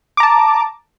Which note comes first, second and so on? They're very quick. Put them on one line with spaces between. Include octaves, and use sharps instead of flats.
D6 A#5 A5